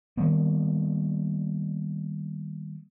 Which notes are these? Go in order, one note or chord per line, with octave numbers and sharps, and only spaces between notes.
D#3 G3 A#3 B3